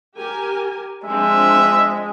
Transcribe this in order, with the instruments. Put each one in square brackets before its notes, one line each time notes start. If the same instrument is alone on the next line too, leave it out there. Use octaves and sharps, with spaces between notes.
[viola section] G4 A#4 G#5
[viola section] F3 C4 D4 [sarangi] G#3 [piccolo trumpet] E5